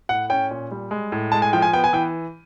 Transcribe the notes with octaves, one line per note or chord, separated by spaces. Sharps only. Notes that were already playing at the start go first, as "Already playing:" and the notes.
A2 F#5
C#4 G5
A#2
G3
G#3
A2
G#3 A5
G#5
F3 G5
G#5
B3 G5
G#5
E3 G5